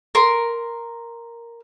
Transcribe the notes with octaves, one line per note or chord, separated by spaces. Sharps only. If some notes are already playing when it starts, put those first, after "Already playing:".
A#4 C6